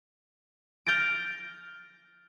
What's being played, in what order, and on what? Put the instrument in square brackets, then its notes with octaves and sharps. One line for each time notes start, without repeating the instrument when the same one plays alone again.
[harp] F6 G6 A6 A#6 D7